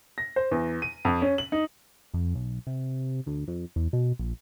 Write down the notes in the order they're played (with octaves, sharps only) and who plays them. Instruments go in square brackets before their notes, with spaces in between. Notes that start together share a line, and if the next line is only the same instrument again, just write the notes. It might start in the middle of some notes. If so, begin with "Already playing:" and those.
[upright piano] A#6
C5
E2
D#7
F2
C#4
F#7
D#4
[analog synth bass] F2
B1
C3
D2
F2
E2
B2
A#1